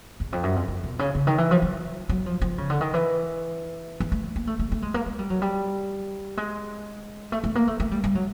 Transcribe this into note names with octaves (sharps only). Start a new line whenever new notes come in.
E2
F2
F#2
F2
F2
B2
C#3
C#3
D#3
E3
F3
F#3
F#3
F3
F3
C#3
D3
D#3
E3
E3
A3
A#3
A3
A3
A3
G#3
A#3
G#3
G3
F#3
G3
G#3
A3
A3
A#3
A3
A3
G3
G3
F#3